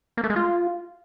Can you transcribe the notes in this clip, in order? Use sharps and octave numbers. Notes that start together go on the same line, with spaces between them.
A#3
A3
G#3
F4